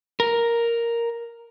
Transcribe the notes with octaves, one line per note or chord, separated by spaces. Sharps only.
A#4